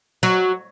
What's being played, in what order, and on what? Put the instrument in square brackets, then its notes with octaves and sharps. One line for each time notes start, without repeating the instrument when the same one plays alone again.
[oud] F#3